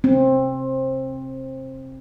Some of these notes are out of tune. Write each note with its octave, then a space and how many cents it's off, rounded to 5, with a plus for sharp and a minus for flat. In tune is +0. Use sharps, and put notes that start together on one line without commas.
C4 +20